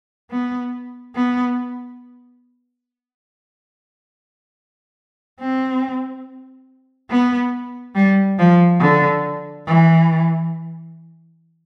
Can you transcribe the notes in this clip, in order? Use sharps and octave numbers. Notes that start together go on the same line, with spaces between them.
B3
B3
C4
B3
G3
F3
D3
E3